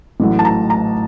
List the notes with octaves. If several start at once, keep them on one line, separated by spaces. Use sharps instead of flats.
A1 A2 F#3
A5
A#5
A#5